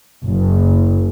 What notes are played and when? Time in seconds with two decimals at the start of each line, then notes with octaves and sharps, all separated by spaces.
0.26 F#1